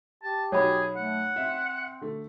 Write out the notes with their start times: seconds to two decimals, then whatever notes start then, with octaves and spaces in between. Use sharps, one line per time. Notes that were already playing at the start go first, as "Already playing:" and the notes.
0.23 G4 A5
0.52 B1 F#4 G#4 C#5 B5
0.96 A3 F#5
1.36 C4 E5
2.01 D3 A3